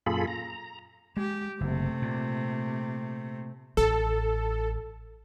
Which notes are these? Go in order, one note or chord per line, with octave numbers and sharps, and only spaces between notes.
F#2 A#2 F4 G#4 A4 B5
A#5
G#3 G4
F#1 C3 A3
A#2
A1 A4